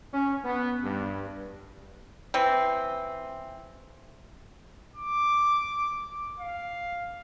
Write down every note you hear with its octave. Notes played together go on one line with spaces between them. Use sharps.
C#4
B3
G2
E3 C4
D6
F5